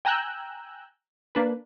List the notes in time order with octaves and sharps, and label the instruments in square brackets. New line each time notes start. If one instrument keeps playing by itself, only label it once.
[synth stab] G5 G#5 A#5 E6 F#6 G6
A#3 D4 B4